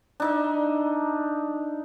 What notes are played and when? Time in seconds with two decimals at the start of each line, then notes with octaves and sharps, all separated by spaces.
0.20 D4 D#4 E5